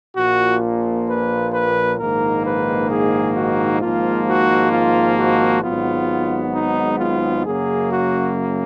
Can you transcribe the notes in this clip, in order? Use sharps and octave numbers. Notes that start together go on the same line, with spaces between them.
A#1 A#2 F3 A#3 F#4
B4
B4
A#1 G#2 D#3 A#3 A#4
B4
G#4
F#4
G#1 G#2 F3 A#3 F4
F#4
F4
F#4
G#1 G#2 F#3 B3 F4
D#4
F4
F#2 C#3 F#3 A#3 G#4
F#4